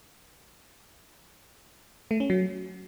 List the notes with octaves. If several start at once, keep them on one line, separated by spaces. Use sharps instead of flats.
A3
C#4
F#3